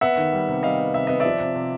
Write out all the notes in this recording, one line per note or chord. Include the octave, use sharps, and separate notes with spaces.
B3 E5 F#5
D#3
G3
C3
G3 D#5 F5
B3
C3 E5
B3 D#5
F3 D5 E5
C3
C3